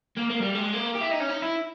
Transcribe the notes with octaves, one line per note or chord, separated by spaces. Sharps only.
A#3
A#3
G3
G#3
A#3
G4
E4
D#4
C#4
D#4
E4